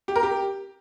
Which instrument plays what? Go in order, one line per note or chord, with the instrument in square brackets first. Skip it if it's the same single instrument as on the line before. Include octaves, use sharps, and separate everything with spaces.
[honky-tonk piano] G4
A#4
G4